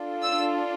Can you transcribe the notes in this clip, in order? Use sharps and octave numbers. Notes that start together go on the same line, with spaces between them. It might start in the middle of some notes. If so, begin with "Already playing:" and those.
Already playing: D4 F4 A4
E6